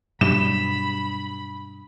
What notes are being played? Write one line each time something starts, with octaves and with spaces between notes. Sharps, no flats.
G2 B2 F#3 G3 B5 E7